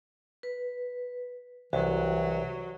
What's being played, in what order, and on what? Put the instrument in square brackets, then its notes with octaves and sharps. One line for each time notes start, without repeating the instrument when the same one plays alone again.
[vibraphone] B4
[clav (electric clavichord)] C2 [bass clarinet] E3 [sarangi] F#3 [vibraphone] F#4